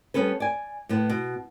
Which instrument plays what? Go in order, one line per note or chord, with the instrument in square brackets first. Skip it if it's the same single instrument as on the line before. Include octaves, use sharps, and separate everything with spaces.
[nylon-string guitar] G3 B3 C#4 A4 B4
D5 G#5
A2 B3
B2